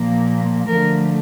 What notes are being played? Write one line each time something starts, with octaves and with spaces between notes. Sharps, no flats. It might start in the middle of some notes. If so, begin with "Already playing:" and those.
Already playing: A#2 F3 A#3
D3 F3 A3 A#4